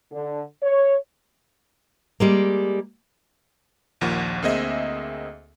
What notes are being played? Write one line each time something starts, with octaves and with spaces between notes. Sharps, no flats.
D3
C#5
G3 G#3 A#3
A#1 D#2 F3 A#3 F#5
D2 A#3 C4 G#4 D#5 E5